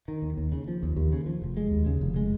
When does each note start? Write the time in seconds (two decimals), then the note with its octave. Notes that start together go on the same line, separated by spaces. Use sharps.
0.08 D#3
0.22 D#2
0.37 D#2
0.52 C#3
0.68 F3
0.83 D#2
0.96 D#2
1.12 C#3
1.26 F3
1.42 F1
1.57 G#3
1.71 D#2
1.86 C#3
2.01 F1
2.16 G#3